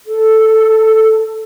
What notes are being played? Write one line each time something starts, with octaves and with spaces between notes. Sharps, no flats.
A4